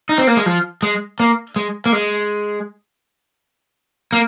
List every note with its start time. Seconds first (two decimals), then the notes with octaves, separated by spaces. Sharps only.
0.09 D#4
0.18 C4
0.27 A#3
0.37 G#3
0.46 F3
0.83 G#3
1.20 A#3
1.56 G#3
1.86 A#3
1.93 G#3
4.13 A#3